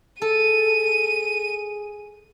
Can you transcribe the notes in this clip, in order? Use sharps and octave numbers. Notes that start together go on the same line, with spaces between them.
G#4 A4 D#7